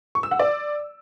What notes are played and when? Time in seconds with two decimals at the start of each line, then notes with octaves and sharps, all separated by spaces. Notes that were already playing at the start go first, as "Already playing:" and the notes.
0.15 C#6
0.23 E6
0.31 F#5
0.39 D5